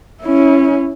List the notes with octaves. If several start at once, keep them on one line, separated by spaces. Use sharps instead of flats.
C#4 E4